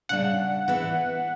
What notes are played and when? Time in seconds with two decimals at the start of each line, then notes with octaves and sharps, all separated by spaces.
0.09 C#3 G3 D4 F#5
0.68 E3 B3 E4